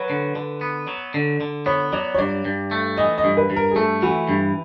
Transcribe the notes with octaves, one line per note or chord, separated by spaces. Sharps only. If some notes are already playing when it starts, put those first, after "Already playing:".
Already playing: F#3 B4
D3
D3
B3
F#3
D3
D3
B3 C#5
F#3 D5
C#5
G2 D5
G2
A3
E3 D#5
D#5
G2
B4
G2
A#4
G#4
A3 A4
E3 F#4
G2